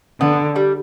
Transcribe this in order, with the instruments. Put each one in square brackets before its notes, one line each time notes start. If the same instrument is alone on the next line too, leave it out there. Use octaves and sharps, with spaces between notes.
[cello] D3 [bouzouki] B3
[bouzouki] G3